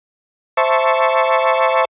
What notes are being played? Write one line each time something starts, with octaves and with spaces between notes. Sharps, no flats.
C5 E5 A5 C#6